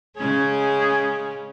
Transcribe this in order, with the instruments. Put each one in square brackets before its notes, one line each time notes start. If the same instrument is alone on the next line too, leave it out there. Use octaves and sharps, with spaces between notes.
[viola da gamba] C#3 G#3 C#4 [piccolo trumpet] G#4